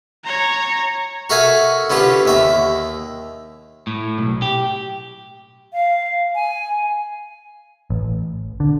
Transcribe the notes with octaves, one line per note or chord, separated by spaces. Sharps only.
C#5 A#5
F#4 A4 A#4 E5 F5 G#5
D3 B3 C#4 F4 G4
D#2 E5 A#5
A2
B1
G4
F5
G#5
A1
D3